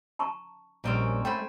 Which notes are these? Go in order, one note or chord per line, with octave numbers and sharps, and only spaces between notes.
A5 A#5 C#6
A#1 G3 A#3 C4 C#4 D#5
A3 C5 G5 G#5 B5